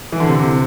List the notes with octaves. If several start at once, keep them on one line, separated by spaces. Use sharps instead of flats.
E3
D3
C3